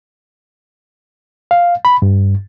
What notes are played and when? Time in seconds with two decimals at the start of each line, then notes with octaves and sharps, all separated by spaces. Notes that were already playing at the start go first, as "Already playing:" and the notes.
1.51 F5
1.85 B5
2.02 G2